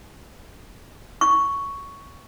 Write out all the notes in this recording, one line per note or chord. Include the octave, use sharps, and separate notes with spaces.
C#6